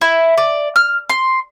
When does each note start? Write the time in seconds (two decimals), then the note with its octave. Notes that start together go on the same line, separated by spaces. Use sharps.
0.01 E4
0.38 D5
0.76 F6
1.10 C6